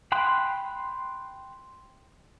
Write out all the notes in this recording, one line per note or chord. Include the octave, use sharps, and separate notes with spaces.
G5 B5 C6 F#6